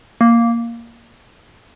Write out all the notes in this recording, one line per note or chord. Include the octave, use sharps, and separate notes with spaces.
A#3